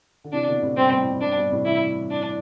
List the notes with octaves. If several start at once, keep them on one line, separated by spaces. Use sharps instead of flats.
D3
C3 E3 D4
B2 D3
A2 C3
G2 B2 C4
G2 B2
A2
A2
G2 D4
G2 B2
A2 C3
C3 E3 E4
D4